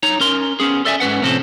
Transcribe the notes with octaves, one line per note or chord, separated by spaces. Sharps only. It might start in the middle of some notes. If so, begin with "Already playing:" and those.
D#4 C#5 A#5
C#4 A#4 C6
B3 C#4 G#4
A4 D5 E5 G5 G#5
G#2 C#4 B4 F#5
A2 C3 F3 C4 C#4 A4